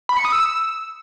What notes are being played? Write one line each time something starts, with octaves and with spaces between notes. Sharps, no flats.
B5
C#7
D#6
E6